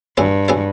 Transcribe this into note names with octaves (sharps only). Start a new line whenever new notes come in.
G2 F#3 B3 E4 G#4
F#3 B3 E4 G#4